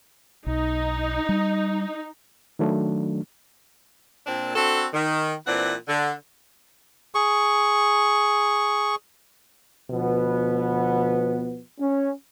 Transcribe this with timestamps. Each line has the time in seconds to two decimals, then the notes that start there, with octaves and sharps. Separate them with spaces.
0.46 B1 D#4
1.29 G3
2.59 D#3 F#3 A3 D4
4.27 A#2 C4 D4
4.55 C4 D4 F#4 A4
4.94 D#3
5.47 A#2 E3 C4 D4 B4 F#5
5.88 D3
7.15 G#4 C#6
9.91 D2 B2 F3 B3
11.80 C#4